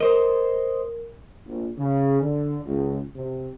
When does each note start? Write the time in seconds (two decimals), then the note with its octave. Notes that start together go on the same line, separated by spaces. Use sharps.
0.01 A#4 C5 D#5
1.46 A#1
1.77 C#3
2.21 D3
2.65 C#2
3.15 C3